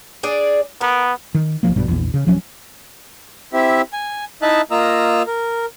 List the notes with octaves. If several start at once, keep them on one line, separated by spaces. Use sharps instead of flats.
D4 G#4 D5
B3 A#4
D#3
D1 A1 F3 A#3
A#1 G2 B2 G3
A#1 E2
C#3
D1 F3 F#3 C#4
C4 E4 G4 E5
G#5
D#4 E4 D#5 E5 A5 F#6
A#3 F4 D#5 A#5 E6
A#4